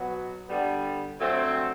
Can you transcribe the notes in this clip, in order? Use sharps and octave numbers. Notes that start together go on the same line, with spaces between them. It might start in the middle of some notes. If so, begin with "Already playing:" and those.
Already playing: B2 F#3 B3
D3 G3 B3
G2 F#3 A3 C4